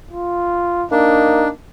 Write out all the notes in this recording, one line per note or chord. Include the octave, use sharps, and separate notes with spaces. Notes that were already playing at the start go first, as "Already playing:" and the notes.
F4
A#3 D4 D#4